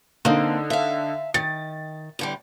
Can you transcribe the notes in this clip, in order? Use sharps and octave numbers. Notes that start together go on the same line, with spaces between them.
D3 A#3 C4 D#4
E5 F5
D#3 A6
E2 D3 G3